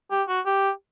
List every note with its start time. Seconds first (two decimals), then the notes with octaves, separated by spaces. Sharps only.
0.11 G4
0.28 F#4
0.45 G4